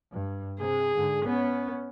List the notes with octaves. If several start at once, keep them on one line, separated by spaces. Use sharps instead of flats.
G2
C3 G#4
G#2 D3
B3 C#4